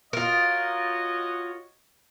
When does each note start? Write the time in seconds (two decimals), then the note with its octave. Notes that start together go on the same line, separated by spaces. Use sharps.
0.13 F4 F#4 A#4 C#5 D#5